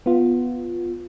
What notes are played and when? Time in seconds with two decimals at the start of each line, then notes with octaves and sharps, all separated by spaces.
0.06 B3 F4